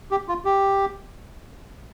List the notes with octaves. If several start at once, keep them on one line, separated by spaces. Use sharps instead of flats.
G4
F4
G4